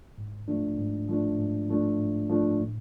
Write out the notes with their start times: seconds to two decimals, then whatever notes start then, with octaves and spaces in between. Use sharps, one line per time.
0.18 G#2
0.48 F3 A3 D4
0.79 G#2
1.09 F3 A3 D4
1.38 G#2
1.69 F3 A3 D4
2.00 G#2
2.30 F3 A3 D4
2.60 A2